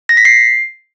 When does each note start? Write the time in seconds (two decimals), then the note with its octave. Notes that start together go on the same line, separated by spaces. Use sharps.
0.09 A#6
0.17 B6
0.25 C7